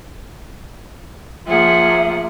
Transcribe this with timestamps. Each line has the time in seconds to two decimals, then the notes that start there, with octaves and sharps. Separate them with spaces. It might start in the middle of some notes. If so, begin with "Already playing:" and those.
1.47 F3 A#3 G#4 E5 F#5